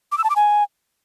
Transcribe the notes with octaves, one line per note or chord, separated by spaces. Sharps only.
D6
E6
A5
D6
G#5